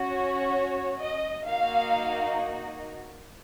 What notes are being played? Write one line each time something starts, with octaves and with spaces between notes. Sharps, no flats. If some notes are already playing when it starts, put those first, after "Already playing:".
Already playing: C#4 F#4
C#5
D#5
A#3 D#4 F#4 F5